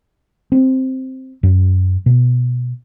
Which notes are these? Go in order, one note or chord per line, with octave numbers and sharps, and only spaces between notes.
C4
F#2
B2